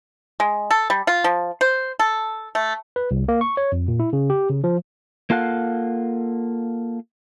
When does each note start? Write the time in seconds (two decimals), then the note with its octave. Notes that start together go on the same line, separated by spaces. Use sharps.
0.40 G#3
0.70 A4
0.90 G3
1.07 F4
1.24 F3
1.61 C5
1.99 A4
2.55 A3
2.96 B4
3.11 C2
3.28 A#3
3.41 C#6
3.57 C#5
3.72 F2
3.88 A#2
4.00 E4
4.13 C#3
4.30 G4
4.50 C#3
4.64 F3
5.30 A#3 F4 A4 F5 F#5